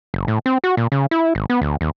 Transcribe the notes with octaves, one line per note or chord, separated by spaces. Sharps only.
F#1
A2
C4
F#4
A#2
C#3
E4
G#1
B3
D2
D#2